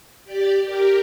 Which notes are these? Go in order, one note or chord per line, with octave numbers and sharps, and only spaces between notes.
G4 D5
G4 A#4